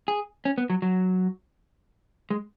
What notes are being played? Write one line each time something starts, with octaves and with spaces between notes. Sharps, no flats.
G#4
C#4
B3
F#3
F#3
G#3